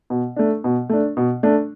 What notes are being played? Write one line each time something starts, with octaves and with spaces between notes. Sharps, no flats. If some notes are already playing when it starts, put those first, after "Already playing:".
B2
A3 D4
B2
A3 D4
B2
A3 D4